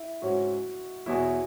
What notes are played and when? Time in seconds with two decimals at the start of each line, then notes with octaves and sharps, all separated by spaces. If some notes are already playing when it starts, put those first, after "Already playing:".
Already playing: E4
0.22 G#2 F#3 C#4 F#4
1.06 E2 B2 F#3 E4 F#4